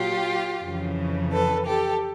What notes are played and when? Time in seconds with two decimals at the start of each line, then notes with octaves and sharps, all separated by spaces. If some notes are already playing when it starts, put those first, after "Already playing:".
Already playing: A#2 F#3 F4 G4
0.62 F2 C#3 E3
1.32 A4 B4
1.66 G4 A4